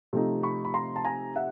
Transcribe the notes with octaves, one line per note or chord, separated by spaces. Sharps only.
C3 F3 A3 C4 D#4
B5 C#6
B5
A#5 C6
A5
G#5 A#5
E5 F#5